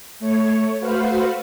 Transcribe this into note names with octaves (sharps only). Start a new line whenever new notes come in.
A3 C#5
A3 F#4 B4 C5 F5